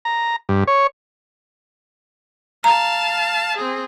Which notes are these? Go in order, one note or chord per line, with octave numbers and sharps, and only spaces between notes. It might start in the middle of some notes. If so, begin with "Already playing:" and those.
A#5
G2
C#5
F5 A5 A#5
C4 G#4